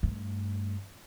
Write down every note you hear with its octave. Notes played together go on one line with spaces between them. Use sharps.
G2 A3